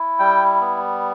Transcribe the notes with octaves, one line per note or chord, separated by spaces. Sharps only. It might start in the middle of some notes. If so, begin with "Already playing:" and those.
Already playing: E4
G3 G5
B3